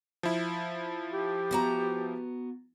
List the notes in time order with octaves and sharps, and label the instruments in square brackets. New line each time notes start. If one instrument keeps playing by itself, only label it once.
[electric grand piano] F3 E4
[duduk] G4
[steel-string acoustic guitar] B3 F#4 A#5